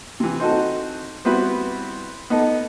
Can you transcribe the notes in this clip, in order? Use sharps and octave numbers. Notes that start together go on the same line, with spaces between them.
C3 E3
C4 D#4 F#4 A4
G3 B3 C4 E4 F#4 B4
B3 D#4 A4